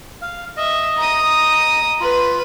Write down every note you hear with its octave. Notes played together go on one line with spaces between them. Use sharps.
F5
D#5 E5
A#5 D#6
F4 B4 B5